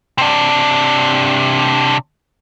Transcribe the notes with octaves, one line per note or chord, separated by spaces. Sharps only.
C3 D4